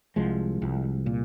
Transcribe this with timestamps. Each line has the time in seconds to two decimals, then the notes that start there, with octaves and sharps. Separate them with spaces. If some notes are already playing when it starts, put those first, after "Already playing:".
0.16 C2 F3 G#3
0.62 C2
1.06 A#2